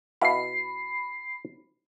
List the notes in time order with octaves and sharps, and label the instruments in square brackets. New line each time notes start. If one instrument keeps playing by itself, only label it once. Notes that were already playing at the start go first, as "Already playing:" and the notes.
[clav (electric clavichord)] B2 E4 F5 [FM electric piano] B5 C7